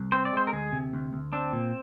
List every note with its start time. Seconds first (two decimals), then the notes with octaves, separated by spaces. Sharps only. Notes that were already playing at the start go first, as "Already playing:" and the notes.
Already playing: C2
0.12 C4 C5
0.25 D5
0.33 G#3 C5
0.47 A#4
0.53 D2 G#4
0.72 C3
0.93 D2
1.13 D2
1.33 C4 D4
1.53 A#2